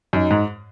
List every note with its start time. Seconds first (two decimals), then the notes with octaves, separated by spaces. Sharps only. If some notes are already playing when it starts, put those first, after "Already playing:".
0.13 F#2 D#4
0.31 G#2